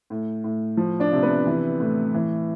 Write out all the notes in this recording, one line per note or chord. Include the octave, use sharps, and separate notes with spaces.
A2
A2
F3
D4 D5
C3
B3 B4
E3
A2
E3